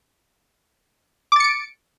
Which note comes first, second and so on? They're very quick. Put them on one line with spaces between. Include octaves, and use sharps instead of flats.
D6 A6 C#7 D7